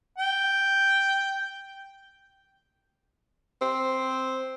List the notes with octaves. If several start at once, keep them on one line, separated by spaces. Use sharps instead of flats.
G5
C4